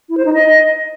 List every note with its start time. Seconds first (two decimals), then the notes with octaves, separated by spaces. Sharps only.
0.09 E4
0.17 C5
0.25 D#4
0.34 D#5